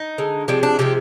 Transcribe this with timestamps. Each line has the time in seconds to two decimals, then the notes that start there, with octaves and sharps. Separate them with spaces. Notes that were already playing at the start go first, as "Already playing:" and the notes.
Already playing: D#4
0.18 D3 G#3
0.48 C3 F3 G#3 D4
0.63 D4
0.79 C3 F3 G#3 G4